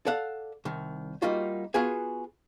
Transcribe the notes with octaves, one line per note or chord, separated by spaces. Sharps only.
A4 D5 F5 F#5
C2 D#3
G3 A#3 D#4 F4 F#4
B3 F4 F#4 G#4 G#5